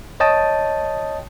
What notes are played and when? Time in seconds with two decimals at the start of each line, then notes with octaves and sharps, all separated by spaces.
0.20 C#5 D#5 G5 A5 D#6